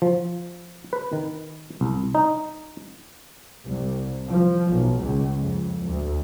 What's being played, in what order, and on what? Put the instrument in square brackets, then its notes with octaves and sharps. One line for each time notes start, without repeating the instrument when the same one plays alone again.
[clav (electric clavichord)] F3
B4
D#3
C2
D#4
[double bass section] C2
F3
B1
C#2
F2
D2